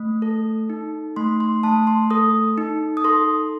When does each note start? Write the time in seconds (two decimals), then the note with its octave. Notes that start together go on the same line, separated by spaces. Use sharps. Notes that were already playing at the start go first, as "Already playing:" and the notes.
Already playing: A3
0.22 A4
0.70 D#4
1.16 A3 C6
1.40 C6
1.63 A3 A5
1.87 C6
2.10 A4 D#6
2.58 D#4
2.97 D#6
3.04 A4 C6